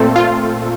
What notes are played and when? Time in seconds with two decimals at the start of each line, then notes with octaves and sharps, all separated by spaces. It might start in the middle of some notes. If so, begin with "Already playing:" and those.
Already playing: A#2 A3 C4 A4
0.16 F4